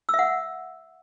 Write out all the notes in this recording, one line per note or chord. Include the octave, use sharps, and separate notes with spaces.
E6
E5
F#5